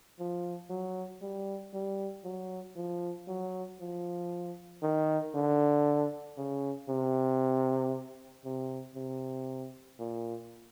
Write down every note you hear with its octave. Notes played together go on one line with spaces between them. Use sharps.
F3
F#3
G3
G3
F#3
F3
F#3
F3
D#3
D3
C#3
C3
C3
C3
A#2